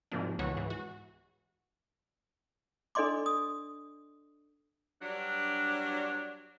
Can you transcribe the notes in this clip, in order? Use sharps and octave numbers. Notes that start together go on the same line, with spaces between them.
G#2 C3 F3 F#3 A#3 D4
C#2 B2 E3 F#4 C#5
G#2 E3
F#4
D4 A4 D5 D#5 C6 D6
D#6
G2 F#3 D4